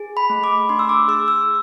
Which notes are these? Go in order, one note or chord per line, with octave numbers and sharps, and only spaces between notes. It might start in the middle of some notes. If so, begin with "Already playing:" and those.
Already playing: G#4
B5
A3
D6
D4 C6
E6
D6
G#4 E6
E6